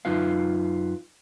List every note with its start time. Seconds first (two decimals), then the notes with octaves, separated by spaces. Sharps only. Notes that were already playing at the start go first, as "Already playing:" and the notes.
0.05 F#2 D#4 F4 B4 F5